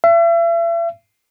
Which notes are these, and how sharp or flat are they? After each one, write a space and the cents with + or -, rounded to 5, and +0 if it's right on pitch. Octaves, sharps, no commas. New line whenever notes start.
E5 +40